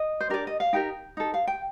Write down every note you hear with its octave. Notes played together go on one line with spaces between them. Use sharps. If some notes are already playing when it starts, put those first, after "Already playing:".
Already playing: D#5
C5
D4 G4 A#4 D5
D#5
F5
D#4 G4 A#4 G5
D#4 A4
F5
G5